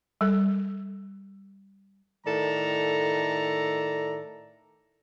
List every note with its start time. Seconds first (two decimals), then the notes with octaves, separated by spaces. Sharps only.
0.21 G3 A4
2.26 A2 D#3 A4 D5 A#5